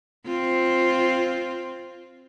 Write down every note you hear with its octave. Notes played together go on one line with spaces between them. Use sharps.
C4 F4